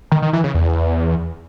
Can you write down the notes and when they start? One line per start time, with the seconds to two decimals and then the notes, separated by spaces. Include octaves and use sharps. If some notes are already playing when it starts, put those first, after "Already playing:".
0.12 D#3
0.22 D#3
0.33 E3
0.44 C#3
0.54 E2